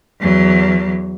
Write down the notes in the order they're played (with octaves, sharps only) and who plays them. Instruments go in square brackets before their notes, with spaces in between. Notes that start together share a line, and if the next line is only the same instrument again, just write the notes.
[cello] E2 F#3